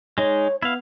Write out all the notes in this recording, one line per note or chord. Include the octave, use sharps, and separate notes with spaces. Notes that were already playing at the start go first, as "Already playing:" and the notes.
G#3 D#4 C#5
B3 E4 F5